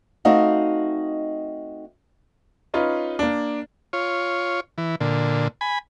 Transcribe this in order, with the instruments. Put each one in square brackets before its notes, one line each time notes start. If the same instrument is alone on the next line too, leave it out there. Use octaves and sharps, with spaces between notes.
[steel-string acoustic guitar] A3 C4 D#4 F#4 D#5 F5
[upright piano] C#4 D#4 F4 B4
A#3 D4
[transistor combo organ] F4 C#5
E3
A#2 D3
G#5 B5